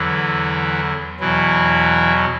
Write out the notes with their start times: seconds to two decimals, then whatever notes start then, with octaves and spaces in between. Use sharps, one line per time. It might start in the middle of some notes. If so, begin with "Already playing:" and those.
Already playing: E2 D3 E3 F#3 E4
1.20 E2 B2 E3 F#3 E4